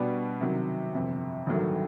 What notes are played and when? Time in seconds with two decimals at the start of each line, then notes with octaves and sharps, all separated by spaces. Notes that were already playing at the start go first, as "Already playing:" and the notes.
Already playing: B2 G3 B3 D4
0.41 C3 D#3 F#3
0.94 G1 F2 C3
1.46 A1 G2 D#3 F#3 A3